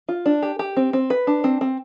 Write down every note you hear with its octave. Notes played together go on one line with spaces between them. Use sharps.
F4
D4
G4
G4
C4
C4
B4
D4
C4
C4